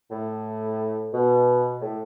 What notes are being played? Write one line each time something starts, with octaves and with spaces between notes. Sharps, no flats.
A2
B2
A2